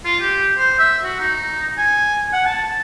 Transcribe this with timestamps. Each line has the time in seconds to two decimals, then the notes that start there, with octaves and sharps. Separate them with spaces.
0.05 F4
0.20 G4
0.58 C5
0.79 E5
1.04 F#4
1.19 D#4
1.78 G#5
2.33 F#5
2.46 A5